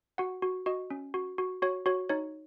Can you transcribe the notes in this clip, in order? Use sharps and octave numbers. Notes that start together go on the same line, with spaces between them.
F#4 F#5
F#4
F#4 D#5
C#4
F#4
F#4
F#4 C#5
F#4 C#5
D#4 C#5